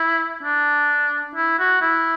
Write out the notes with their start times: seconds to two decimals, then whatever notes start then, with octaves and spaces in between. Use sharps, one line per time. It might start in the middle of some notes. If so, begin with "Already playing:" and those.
Already playing: E4
0.43 D4
1.36 E4
1.59 F#4
1.81 E4